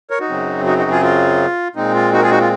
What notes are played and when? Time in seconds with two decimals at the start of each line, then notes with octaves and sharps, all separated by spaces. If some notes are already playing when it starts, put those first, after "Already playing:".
0.10 A#4 C#5
0.20 D#4 F#4
0.29 F#2 C#3 F#3 C4
0.66 D#4 F#4
0.78 D#4 F#4
0.91 F4 G#4
1.02 F4
1.75 A#2 G#3 C4 D#4
1.94 F4
2.13 D#4 F#4
2.18 A#4
2.22 F4 G#4
2.31 D#4 F#4
2.41 F4